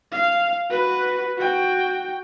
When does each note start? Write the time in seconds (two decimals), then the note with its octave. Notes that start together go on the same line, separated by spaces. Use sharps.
0.12 F5
0.70 F#4 B4
1.38 F#4 G5